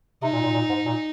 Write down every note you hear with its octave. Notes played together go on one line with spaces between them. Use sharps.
C3 D#4
A#2
A#2
A#2
G#2
A#2